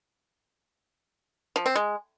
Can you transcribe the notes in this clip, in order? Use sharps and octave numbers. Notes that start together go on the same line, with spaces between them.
F3
C4
G#3